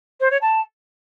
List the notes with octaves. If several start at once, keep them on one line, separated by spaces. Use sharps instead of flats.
C5
C#5
A5